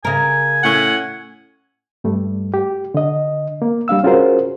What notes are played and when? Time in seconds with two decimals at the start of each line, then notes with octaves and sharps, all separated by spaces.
0.05 C#3 A#4 G#5
0.63 A2 C#4 F#5
2.04 G2 G3 A3
2.54 G4
2.94 D3 D#5
3.62 A#3
3.88 G3 D4 F5 E6
4.04 C#4 F4 F#4 G#4 A#4 C5